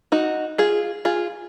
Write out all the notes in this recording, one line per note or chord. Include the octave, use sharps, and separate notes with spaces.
D#4 F#4
F4 G#4
F4 G#4